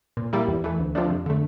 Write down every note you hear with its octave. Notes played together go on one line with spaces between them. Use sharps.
A#2
G3 A#3 E4
E2
E3 A3
D2
C3 F3 A3 D4
F2
D3 A3